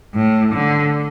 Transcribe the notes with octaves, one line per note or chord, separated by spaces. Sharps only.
A2
D3